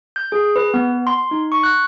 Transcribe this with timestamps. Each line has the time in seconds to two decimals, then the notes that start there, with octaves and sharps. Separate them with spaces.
0.16 G6
0.32 G#4
0.56 B4
0.74 B3
1.07 C6
1.31 D#4
1.52 C#6
1.63 F#6